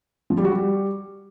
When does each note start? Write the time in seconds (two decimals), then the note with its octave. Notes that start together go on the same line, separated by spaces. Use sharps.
0.30 F3
0.37 G3
0.44 F#4
0.52 G3